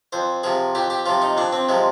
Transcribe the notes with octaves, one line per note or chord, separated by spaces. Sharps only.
F2 C5
C3 F3 G#4
F2 G4
G4
C3 F3 F4
D#4
F2 D4
C4
C3 F3 G#3